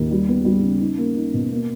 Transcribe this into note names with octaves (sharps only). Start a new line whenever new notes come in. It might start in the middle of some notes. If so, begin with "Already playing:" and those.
Already playing: D#2
G3
B3
G3
C#3
D#4
A#3
D#4
B2
A#3